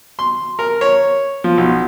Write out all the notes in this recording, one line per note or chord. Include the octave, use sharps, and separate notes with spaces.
C6
A#4
C#5
F3
B1